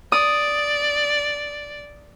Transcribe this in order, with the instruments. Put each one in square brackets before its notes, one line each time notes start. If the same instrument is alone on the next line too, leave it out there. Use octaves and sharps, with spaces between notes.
[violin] D5 [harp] D#6